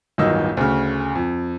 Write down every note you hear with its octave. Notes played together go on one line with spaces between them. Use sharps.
D1 G1 D#3 F#3 D#5 E6
D2 C#3
F2